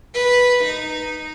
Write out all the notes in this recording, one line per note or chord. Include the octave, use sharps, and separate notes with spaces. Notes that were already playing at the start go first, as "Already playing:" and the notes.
B4
D#4